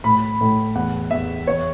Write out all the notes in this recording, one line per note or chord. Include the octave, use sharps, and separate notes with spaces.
A2 B5
A2
E2 F#5
E2 E5
E2 C#5